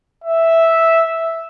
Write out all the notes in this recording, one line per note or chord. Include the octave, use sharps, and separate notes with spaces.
E5